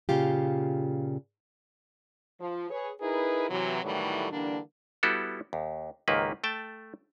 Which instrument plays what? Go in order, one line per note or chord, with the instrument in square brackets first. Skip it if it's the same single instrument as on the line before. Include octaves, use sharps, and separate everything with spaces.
[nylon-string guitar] A#2 C#3 F4 G4
[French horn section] F3
G#4 B4 C#5
D#4 E4 G#4 A#4 B4
C3 E3 F#3
A2 D#3 E3 F#3 G3 A3
D3 E3 G3 A#3 D4
[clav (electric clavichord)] G3 B3 E4 F#4 G4 A4
D#2
C#2 G#2 D#3 A#3 G4 B4
A3 G5 A5